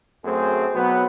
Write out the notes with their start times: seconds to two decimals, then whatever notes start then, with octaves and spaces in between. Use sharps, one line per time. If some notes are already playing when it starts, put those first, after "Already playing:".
0.25 F#2 A3 C4 G#4 C5
0.74 B1 F#3 B3